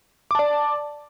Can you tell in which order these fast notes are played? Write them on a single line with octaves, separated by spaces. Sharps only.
D6 A5 D5